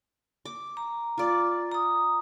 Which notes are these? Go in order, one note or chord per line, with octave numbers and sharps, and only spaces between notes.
D6
A#5
F4 D5
A#5 D#6